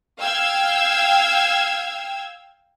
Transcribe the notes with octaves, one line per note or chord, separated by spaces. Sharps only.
F5 G5 E6 G#6